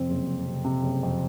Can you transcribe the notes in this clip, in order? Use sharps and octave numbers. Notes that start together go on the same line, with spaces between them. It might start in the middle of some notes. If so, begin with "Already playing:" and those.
Already playing: F2 C3 C4 C5
F#1
F#1
C3
C3
F#1
F2